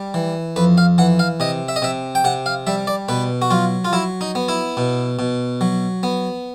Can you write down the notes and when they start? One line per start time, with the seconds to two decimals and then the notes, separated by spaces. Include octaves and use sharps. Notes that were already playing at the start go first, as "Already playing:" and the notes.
Already playing: G3
0.14 E3
0.56 F2 B4
0.78 F5
0.98 E3 F#5
1.19 F5
1.40 C3 D#5
1.68 E5
1.76 D#5
1.82 C3 E5
2.15 G5
2.24 C3 F#5
2.46 F5
2.67 G3 E5
2.87 D5
3.09 B2 B4
3.42 F#4
3.50 F#3 F4
3.85 F4
3.93 F#3 E4
4.21 D#4
4.35 B3
4.48 E4
4.77 B2
5.19 B2
5.61 F#3
6.03 B3